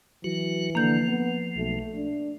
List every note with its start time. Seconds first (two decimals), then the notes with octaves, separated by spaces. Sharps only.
0.24 E3 F#3 F#4
0.75 D3 F3 A#3 G6
1.08 B3
1.56 B1 A3
1.94 D4